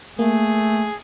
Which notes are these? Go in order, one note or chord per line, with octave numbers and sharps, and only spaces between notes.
A3 A#3 G#4